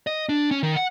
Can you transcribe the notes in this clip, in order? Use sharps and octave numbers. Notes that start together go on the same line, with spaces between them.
D#5
D4
C#4
D#3
F#5